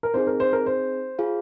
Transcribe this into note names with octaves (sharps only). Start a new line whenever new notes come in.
A#4
C4 D#4 G#4 C5
A#4
C5
A#4
C5
F4 G#4 F5